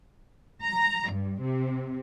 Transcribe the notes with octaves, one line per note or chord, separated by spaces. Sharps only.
A#5
G2
C3